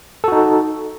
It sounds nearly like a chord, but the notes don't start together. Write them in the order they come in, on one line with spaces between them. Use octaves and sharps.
A4 F#4 D#4